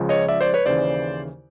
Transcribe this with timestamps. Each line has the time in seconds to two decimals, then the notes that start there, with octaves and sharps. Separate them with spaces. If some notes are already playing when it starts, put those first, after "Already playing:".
Already playing: C#2 C#3 F3 G#3
0.09 C#5 D#5
0.28 D5 E5
0.41 C5 D5
0.54 B4 C#5
0.66 D#2 C#3 E3 C5 D5